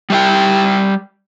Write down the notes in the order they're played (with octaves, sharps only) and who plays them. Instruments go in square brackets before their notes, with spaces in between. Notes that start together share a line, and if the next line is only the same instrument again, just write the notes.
[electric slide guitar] G3 E5 G5